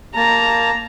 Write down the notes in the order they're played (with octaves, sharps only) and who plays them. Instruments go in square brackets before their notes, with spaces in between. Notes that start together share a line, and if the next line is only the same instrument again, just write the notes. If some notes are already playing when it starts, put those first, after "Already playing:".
[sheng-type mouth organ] A#3 A5 [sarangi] A#5